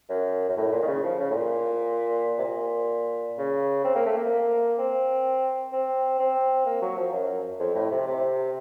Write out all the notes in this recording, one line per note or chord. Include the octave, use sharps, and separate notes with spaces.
F#2
F#2
A2
A2
A#2
D#3
C#3
F3
C#3
A2
A#2
C3
A#2
C#3
C4
A#3
A3
A#3
C4
C4
C4
A#3
F#3
F3
F#2
F2
A2
C3
C3